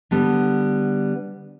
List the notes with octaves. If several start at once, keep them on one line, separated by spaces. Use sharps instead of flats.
D3 G3 B3